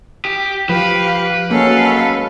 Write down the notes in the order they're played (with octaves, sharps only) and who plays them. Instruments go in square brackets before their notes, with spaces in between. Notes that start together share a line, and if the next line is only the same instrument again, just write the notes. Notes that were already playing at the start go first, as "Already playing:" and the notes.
[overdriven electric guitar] G4
[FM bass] F3 [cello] G4 F5 [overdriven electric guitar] B4
[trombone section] F#3 G#3 C#4 [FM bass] A#3 [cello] A4 F5